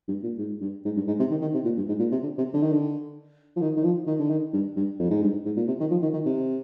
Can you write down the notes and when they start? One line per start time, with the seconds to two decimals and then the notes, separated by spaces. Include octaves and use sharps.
0.08 G2
0.23 A#2
0.38 G#2
0.61 G2
0.85 G#2
0.96 G2
1.08 G#2
1.20 C3
1.31 D#3
1.42 D#3
1.54 C3
1.65 A#2
1.77 G2
1.88 G#2
1.99 A#2
2.12 C3
2.23 D3
2.38 C3
2.54 D3
2.63 D#3
2.72 D3
3.56 F3
3.61 D#3
3.77 D#3
3.84 F3
4.07 D#3
4.19 D3
4.30 D#3
4.53 G2
4.76 G2
5.00 F2
5.10 G#2
5.23 G2
5.45 G#2
5.57 A#2
5.68 C3
5.80 D#3
5.91 F3
6.03 D#3
6.14 D#3
6.26 C3